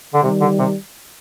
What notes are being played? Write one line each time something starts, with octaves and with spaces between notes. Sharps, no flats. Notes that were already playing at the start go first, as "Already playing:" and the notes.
D3
C3 D#3 G3
D3
C3